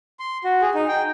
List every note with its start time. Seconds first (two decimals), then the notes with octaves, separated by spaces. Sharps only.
0.19 C6
0.44 F#4
0.62 G#4
0.75 D#4
0.88 G5